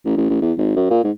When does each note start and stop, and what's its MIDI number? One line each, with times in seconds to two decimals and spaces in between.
0.05 0.17 33
0.17 0.28 33
0.30 0.37 33
0.42 0.53 40
0.58 0.75 32
0.76 0.88 42
0.90 1.00 46
1.04 1.11 44